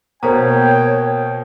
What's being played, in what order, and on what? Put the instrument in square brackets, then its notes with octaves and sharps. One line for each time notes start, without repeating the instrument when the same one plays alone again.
[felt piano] B2 A#3 [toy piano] C5 F5 A#5 [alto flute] C#5 [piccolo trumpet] G5